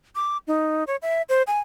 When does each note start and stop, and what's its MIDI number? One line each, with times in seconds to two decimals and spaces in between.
0.15 0.38 86
0.47 0.84 63
0.87 0.96 73
1.02 1.22 76
1.29 1.43 72
1.47 1.60 80